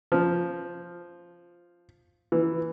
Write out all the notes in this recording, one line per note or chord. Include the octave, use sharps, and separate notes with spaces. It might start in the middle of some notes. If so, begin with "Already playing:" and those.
F3
E3